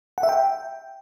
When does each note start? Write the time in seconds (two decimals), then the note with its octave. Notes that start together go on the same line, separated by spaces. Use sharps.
0.18 F#5
0.23 E5
0.29 G5